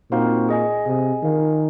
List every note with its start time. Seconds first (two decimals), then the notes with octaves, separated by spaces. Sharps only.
0.11 A#2 C4 D#4 F#4 C5 F5
0.49 G#4 D#5 G#5
0.86 C3 G#4 D#5 G#5
1.23 D#3 F4 A#4 F5 G#5